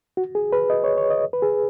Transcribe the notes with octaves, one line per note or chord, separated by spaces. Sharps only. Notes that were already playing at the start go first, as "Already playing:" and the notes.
F#4
G#4
B4
D#5
C#5
C#5
D#5
B4
G#4